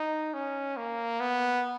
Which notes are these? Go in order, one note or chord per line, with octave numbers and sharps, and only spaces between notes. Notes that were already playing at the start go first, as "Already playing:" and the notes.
Already playing: D#4
C#4
A#3
B3